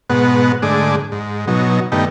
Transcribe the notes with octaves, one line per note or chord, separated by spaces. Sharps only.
G#2 B2 B3 F#5
G#2 D3 A3 G#4 D6
G#2
B2 F#3 D#4
G2 D#3 A3 B3 D#4 G5